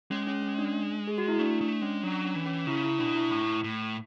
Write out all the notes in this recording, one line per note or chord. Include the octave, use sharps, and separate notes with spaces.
G#3 C#4
C#4
C#4
D4
G#4
F#4
E4
A3 D4
A3 D4
G#3 C#4
F#3 D4
C#4
E3
C#4
C#3 E4
E4
B2 D4
E4
A2
A2